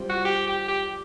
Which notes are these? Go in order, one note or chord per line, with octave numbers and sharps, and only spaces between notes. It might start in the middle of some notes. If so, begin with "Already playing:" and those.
Already playing: G3 C4 F4
F#4
G4
G4
G4